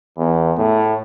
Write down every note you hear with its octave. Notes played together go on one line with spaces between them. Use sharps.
E2
A2